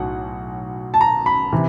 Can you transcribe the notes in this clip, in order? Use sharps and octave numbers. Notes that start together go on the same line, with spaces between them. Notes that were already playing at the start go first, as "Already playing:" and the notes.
Already playing: B1 A2 F#3 F#5
A5
A#5
B5
C3 E3